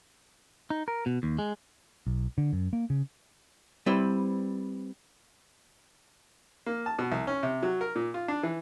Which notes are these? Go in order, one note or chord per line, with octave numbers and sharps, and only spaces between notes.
D#4
A#4
B2
D#2
G#3
B1
D3
F#2
A#3
C#3
G3 C4 E4 B4 C5
A#3
A5
B2
C2
C#4
C3
F#3
A#4
A#2
F4
D4
E3